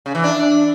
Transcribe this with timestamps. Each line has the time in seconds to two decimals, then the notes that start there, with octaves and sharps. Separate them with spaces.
0.06 C#3
0.15 E3
0.24 D4